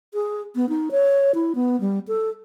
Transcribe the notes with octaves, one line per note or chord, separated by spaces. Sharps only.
G#4
B3
D#4
C#5
E4
B3
G3
A4